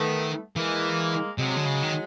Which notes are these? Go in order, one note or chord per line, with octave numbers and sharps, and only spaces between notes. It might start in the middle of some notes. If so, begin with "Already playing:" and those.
Already playing: D#3 A3 B3
E3 G#3 A#3
C3 F#3 G#3
D3
C#3
D#3